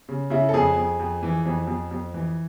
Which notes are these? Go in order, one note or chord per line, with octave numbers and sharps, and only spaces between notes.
C#3
C#3 E4
A4
F2 G#4
F2
F2
E3
F2
F2
F2
E3